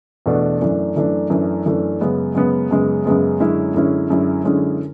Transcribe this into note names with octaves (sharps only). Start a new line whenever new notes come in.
E2 B2 A3 D4 F#4
F#2 E3 A3 D4
F#2 E3 A3 D4
F#2 E3 A3 D4
F#2 E3 A3 D4
F#2 C#3 G#3 B3
F#2 C#3 G#3 B3
F#2 C#3 G#3 B3
F#2 C#3 G#3 B3
F#2 D3 G#3 C#4 E4
F#2 D3 G#3 C#4 E4
F#2 D3 G#3 C#4 E4
F#2 D3 G#3 C#4 E4